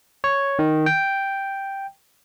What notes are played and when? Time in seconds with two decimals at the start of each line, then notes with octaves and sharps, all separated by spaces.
0.24 C#5
0.59 D#3
0.86 G5